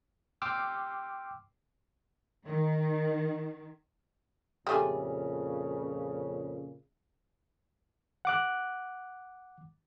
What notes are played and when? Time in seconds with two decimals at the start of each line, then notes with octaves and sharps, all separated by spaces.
0.42 G5 C6 D6 E6 F6
2.45 D#3
4.67 F2 A#2 C#3 G3 A3 G#4
8.25 F#5 D6 F#6